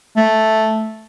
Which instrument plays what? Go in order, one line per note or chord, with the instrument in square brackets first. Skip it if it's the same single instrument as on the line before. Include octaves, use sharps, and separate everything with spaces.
[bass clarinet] A3